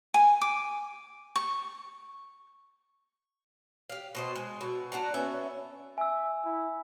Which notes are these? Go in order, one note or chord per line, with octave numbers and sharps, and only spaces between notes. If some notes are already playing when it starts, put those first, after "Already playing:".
G#5
D6
C#6
G4 F5
B2 C5 D#5
G#3
B2 E5
D4 F#4 D5 A#5
B3 C#4 E5
E5 G#5 E6
E4